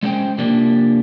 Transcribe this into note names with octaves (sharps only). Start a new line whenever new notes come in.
G#3 C#4 D4 C5 G5
C3 F3 A#3 D4 G4